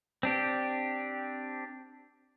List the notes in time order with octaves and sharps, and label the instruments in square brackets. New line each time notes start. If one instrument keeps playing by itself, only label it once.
[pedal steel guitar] C4 D4 G4